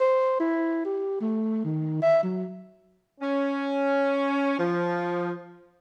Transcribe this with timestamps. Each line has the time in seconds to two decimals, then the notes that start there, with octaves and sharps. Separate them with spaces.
0.01 C5
0.40 E4
0.85 G4
1.21 A3
1.65 D#3
2.02 E5
2.23 F#3
3.21 C#4
4.58 F3